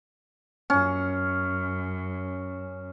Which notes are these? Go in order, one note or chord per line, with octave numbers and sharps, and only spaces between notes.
F#2 C#4